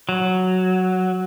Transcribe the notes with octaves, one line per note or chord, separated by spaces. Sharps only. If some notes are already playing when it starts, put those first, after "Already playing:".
F#3